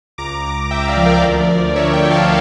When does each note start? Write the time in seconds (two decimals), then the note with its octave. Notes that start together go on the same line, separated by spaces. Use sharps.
0.18 C#2 A#5 D6
0.44 C#2
0.71 C#2 E5 G5
0.88 D5 F5
0.97 F3
1.06 A#4 D5
1.16 E5
1.23 D2 A#4 D5
1.50 D2
1.75 D3 C#5 E5
1.93 E5 G5
2.02 F3
2.10 F5 A5